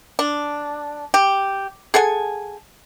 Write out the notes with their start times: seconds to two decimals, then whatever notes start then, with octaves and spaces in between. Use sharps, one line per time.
0.19 D4
1.14 G4
1.94 G#4 A4 F#5 G#5